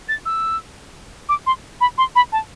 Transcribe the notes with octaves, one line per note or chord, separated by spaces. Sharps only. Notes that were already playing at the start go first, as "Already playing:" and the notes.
A6
E6
D6
C6
B5
C6
B5
A5